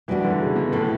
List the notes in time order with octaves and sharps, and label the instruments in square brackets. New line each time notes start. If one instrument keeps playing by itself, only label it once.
[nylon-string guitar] B2 G3 B3 D4 F#4 [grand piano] E3
[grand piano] D3
C#3
B2
[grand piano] A2 [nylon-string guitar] B3 E4 A4